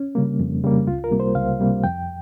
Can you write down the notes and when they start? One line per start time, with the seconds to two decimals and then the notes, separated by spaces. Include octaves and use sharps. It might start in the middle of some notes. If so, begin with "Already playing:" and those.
Already playing: C#4
0.15 C#3 G3 A#3
0.39 F2
0.63 C#3 G3 A#3
0.87 C#2 F4
1.04 A#4
1.11 C3 G3 A#3
1.20 C5
1.35 C#2 F5
1.59 C3 G3 A#3
1.84 F2 G5